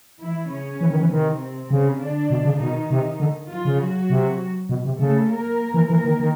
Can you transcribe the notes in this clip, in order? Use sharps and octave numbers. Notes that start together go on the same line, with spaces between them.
E3 E4
C#3 C#4
E3
D#3
E3
C3 D#3 C4
C#3
D3 D4
B2
C#3
B2 D#3 D#4
C3
D3
F3 F4
C#3
F#3 F#4
C3
B2
C3
C#3 A3 A4
A#3 A#4
E3
E3 A#3 A#4
D#3
D#3